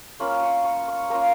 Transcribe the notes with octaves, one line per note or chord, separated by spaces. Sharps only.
A#3 C#4 F4 B5
C#6
C#6
C#6
A#3 C#4 F4 A#5